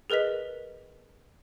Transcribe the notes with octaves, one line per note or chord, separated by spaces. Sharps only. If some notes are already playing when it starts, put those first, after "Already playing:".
G#4 A#4 B4 D#5 B6